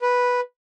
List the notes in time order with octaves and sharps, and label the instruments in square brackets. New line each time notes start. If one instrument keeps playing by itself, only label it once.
[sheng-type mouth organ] B4